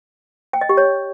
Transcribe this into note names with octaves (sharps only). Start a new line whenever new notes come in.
G5
D#5
G4
C#5